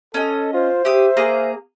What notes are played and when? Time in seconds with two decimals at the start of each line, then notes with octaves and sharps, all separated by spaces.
0.14 C#4 A4 D#5
0.53 F4 C5
0.85 G4 E5 D#6
1.17 A#3 G#4 A#5